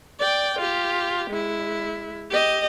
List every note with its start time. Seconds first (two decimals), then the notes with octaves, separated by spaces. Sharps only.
0.20 D5 G5
0.59 F4 G4
1.30 G#3 E4
2.31 G4 D#5